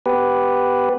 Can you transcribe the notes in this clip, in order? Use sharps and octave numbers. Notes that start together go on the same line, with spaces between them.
B3 G4 B4